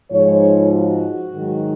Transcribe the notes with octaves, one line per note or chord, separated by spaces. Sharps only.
G#2 F3 C#5
F#4
G#2 D#3 F#3